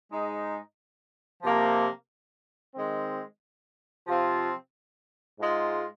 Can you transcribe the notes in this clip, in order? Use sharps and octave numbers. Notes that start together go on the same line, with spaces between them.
G#2 G#3 D#4
C3 F3 A#3
D#3 G#3 C4
C3 F3 C4 F4
G#2 G#3 F4